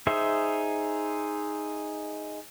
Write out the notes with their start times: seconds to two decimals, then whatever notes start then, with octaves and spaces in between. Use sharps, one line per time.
0.07 D#4 G#4 C5 E5